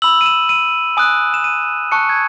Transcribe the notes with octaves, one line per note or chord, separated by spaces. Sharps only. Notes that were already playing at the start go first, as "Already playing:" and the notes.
B5 E6 F#7
D#7
E7
D#7
G#5 D#6 F#6
E7
D#7
A5 C#6 F#6 C#7
G#6